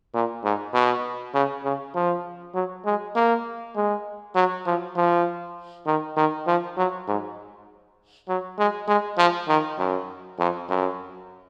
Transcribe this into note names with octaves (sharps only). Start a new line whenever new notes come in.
A#2
G#2
B2
C#3
C#3
F3
F#3
G#3
A#3
G#3
F#3
F3
F3
D#3
D#3
F3
F#3
G#2
F#3
G#3
G#3
F3
D#3
F#2
F2
F#2